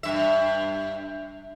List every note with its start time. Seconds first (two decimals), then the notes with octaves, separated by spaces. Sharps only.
0.03 G2 E5